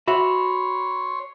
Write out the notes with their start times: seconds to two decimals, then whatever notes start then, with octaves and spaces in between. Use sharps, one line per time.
0.08 F#4 C#5 E5 B5 C6